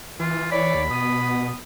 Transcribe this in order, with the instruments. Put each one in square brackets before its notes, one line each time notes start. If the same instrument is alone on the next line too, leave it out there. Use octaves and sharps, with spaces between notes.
[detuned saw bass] E3 [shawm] F4
[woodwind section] C#5 D5 [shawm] B5
[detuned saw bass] D#2
[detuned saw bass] B2 [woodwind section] B3 D#6